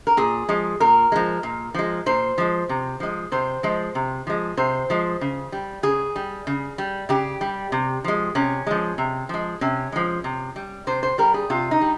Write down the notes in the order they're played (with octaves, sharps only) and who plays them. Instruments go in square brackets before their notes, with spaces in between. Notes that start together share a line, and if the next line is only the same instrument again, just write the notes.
[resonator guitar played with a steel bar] A#4
A#2 G#4
F3 G#3
A#2 A#4
F3 G#3
A#2
F3 G#3
A#2 C5
F3 G#3
C3
F3 G#3
C3 C5
F3 G#3
C3
F3 G#3
C3 C5
F3 G#3
C#3
G3
C#3 G#4
G3
C#3
G3
C#3 G4
G3
C3
F3 G#3
C3 C#4
F3 G#3
C3
F3 G#3
C3 C#4
F3 G#3
C3
G3
C3 C5
C5
G3 A#4
G#4
C3 F4
D#4
G3